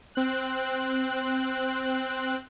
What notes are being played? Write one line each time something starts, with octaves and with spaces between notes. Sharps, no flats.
C4 F#6